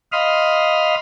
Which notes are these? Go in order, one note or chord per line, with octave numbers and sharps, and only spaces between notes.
D#5 F5 B5 C6 D#6 F6